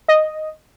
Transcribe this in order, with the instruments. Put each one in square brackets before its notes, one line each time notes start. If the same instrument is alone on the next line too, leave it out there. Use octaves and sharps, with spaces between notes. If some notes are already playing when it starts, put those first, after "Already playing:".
[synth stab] D#5